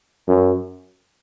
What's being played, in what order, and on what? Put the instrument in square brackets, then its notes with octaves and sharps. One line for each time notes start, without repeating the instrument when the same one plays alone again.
[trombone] F#2